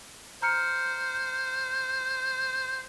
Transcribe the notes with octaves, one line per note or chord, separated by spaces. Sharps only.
C5 A#5 F6 C#7